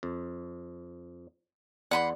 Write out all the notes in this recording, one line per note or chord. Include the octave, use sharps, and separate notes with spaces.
F2
E2 D5 F#5 B5 C6